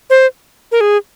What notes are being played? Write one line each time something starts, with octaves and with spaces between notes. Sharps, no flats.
C5
A#4
G#4